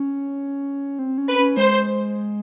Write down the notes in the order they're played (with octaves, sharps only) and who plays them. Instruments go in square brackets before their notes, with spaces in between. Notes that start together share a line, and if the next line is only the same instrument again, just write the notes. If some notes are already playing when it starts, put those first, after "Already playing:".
Already playing: [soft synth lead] C#4
C4
C#4
[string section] B4
[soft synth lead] C#4
[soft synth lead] G#3 [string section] C5